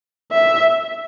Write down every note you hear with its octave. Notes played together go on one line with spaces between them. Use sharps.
E5